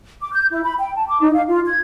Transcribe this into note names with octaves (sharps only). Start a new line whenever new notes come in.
D6
G6
E4
B5
G5
A5
D6
D#4
F5
F4
G#6